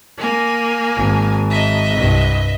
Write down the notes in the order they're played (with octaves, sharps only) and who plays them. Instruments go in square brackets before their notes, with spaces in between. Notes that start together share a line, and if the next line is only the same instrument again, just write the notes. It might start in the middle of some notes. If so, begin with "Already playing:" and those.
[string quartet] A#3 G#5
[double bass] G#1
[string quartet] D#5 E5
[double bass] C2 G2